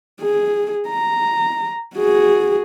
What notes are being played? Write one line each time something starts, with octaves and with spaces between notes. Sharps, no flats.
G#4
A#5
F#4 G#4